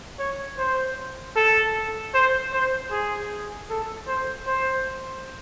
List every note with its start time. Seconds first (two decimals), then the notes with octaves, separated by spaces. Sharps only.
0.19 C#5
0.58 C5
1.36 A4
2.14 C5
2.53 C5
2.91 G#4
3.70 A4
4.07 C5
4.47 C5